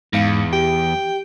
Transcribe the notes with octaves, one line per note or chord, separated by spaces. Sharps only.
E2 G#2 F5 C#7
G4 G5